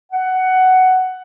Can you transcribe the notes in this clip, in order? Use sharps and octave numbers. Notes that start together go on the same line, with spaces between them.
F#5